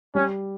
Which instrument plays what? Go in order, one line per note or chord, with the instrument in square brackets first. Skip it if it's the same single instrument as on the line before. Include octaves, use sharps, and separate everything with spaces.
[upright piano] G3 [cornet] C#4